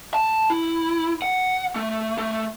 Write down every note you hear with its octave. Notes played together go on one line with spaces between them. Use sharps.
A5
E4
F#5
A3
A3